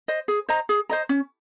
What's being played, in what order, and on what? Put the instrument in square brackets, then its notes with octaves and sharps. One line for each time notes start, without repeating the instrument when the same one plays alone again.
[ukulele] C5 D#5
G#4
C5 D#5 A#5
G#4
C5 D#5 A#5
C#4